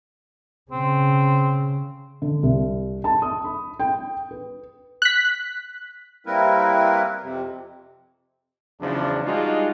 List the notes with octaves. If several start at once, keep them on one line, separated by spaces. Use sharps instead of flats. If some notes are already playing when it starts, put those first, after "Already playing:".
C#3 C4
D3
C2
A5
D#6
B5
G5
B4
F#6 B6
G3 A#3 C4 E4 A#4 B4
F2 C3
E2 C#3 F3 F#3 D4
G3 G#3 D4 D#4 F4 F#4